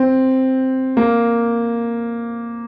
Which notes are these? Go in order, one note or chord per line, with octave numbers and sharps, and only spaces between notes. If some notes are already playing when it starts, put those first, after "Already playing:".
Already playing: C4
A#3